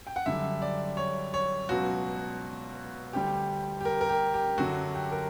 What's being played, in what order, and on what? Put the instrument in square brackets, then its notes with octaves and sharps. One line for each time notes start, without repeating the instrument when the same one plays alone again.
[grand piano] G5
F#5
F#2 D3 G3 E5
D5
C#5
C#5
C#2 B2 F#3 F#4
D2 D3 G3 G4
G4
A#4
A#4
G4
G4
F#2 D3 F#3 F#4
G4
A#4